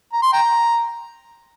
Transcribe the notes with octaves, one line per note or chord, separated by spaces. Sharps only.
A#5
C6
G5 A#5